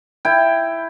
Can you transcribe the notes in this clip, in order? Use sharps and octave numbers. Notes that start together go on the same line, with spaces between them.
E4 G5